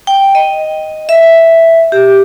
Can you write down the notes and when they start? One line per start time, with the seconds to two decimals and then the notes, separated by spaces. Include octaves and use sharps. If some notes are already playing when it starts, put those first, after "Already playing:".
0.07 G5
0.35 D#5
1.09 E5
1.92 G4